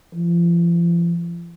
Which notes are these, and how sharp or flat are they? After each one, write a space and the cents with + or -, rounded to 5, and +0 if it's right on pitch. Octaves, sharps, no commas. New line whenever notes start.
F3 -40